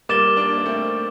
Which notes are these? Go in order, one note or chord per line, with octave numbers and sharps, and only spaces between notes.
G3 A#3 D6 A6 E7 G7
A#3 D4
A#3
A3 C4